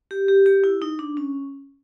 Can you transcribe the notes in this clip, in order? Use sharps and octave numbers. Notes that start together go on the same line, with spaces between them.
G4
G4
G4
E4
D#4
D4
C#4